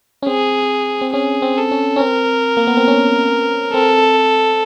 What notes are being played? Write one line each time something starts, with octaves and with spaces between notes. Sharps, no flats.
C#4
C4 G#4
C4
C#4 G#4
C4
A4
C#4
C#4
C4 A#4
A#3
B3
C4
C#4
C4 A4